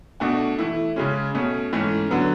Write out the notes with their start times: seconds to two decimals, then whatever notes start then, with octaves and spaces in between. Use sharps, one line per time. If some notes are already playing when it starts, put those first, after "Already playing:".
0.20 B2 A3 D4 F#4
0.58 E3 A3 E4
0.96 C#3 G#3 C#4
1.35 B2 A3 C#4
1.73 G#2 E3 A3 C#4
2.11 D3 F#3 B3